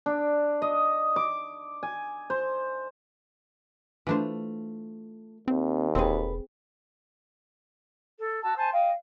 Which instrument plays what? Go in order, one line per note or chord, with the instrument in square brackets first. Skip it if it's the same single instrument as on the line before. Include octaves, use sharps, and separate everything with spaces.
[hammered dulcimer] D4
D#5
D6
G#5
C5
[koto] E3 D4 C5 [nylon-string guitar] A3 F4
[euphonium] D#2 [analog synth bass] C4
[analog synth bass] E1 [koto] C4 G#4 [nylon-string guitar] A4 B4
[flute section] A4
F#4 A5 E6
C5 G#5 A5 C6
D#5 F5 G5